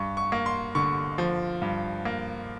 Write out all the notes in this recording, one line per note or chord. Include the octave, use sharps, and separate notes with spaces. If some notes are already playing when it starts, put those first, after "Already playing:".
Already playing: G2 C#6
C#6
A#3
C6
D3 C#6
F3
G2
A#3